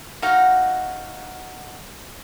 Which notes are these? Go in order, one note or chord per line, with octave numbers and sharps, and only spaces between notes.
D#4 F#4 F5 F#5